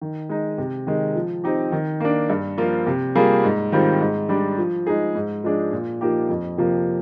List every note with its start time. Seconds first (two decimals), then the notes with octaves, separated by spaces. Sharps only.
0.01 D#3
0.29 G#3 D#4
0.58 C3
0.87 D#3 G#3
1.15 F3
1.44 C4 D#4 G4
1.72 D#3
2.00 A#3 D4
2.29 G2
2.58 F3 A#3 F4
2.87 C3
3.15 G3 A#3 F4 G#4
3.44 G#2
3.72 D#3 G3 C4 F4
4.01 G#2
4.29 G3 D4
4.58 F3
4.87 G#3 D#4 G#4
5.15 G#2
5.44 F3 G#3 D4 G#4
5.72 A#2
6.01 F3 A#3 D#4 G4
6.29 F2
6.58 C3 F3 A#3